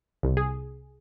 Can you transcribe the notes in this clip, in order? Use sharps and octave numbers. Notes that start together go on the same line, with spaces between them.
C2
G#4